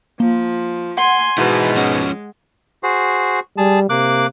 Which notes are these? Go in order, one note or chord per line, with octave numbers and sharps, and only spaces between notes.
F3 A#3
F#5 G#5 C6
G#2 B2 G#3 E4 B4
F3 C#4
F#4 G#4 C5
G3 G#4 A5
C3 A#3 D6 F#6